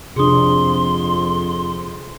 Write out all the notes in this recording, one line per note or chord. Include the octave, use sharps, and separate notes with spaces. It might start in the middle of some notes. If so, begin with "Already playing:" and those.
F2 C3 D4 G#4 C6 D#6